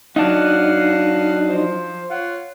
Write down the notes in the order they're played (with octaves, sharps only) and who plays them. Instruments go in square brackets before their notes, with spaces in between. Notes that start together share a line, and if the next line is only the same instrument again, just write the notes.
[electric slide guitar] F#3 D4 D#4 [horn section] F5 F#5
[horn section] F3 C5
F4 C#5 F#5